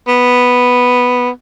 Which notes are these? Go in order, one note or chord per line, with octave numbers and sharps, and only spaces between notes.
B3